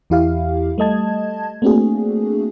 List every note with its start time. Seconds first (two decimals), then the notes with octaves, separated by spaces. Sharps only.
0.10 E2 E3 E4 G4 F5
0.78 G3 A3 D#5 A5 G#6
1.62 A3 A#3 C4 D4 F#4 G#4